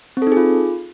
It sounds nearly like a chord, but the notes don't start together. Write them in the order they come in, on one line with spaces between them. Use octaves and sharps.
C4 A4 D#4 G#4 F4